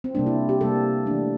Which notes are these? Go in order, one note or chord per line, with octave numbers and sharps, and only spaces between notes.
C4
C3 G3 A#3 D4
E4
G4
C3 G3 A#3 A4
E3 A3 D4